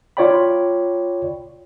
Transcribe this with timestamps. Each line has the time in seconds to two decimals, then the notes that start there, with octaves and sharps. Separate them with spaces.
0.17 F4 C#5 D5 G5 B5